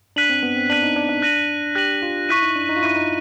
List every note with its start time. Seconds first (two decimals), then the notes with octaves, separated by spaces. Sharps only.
0.16 D4 F#6 B6 D#7 F#7
0.30 C4
0.43 B3
0.56 C4
0.70 D4 F#6 B6 D#7 F#7
0.83 D#4
0.96 D4
1.09 D4
1.22 F#6 A#6 D#7 F#7
1.75 G4 F#6 A#6 D#7 F#7
2.02 F4
2.29 E4 C#6 F#6 B6 D#7
2.43 D#4
2.56 D4
2.69 D#4
2.76 F4
2.83 E4 C#6 F#6 B6 D#7
2.96 D#4